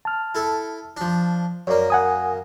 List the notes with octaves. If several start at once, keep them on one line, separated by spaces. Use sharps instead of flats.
A5 F6
E4 A4
F3 D4
F#2 A#3 C#5 D5
F#5 G#5 D#6